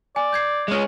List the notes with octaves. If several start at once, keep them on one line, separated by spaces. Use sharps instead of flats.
D5 G#5
G6 G#6 C7
G#3 C#4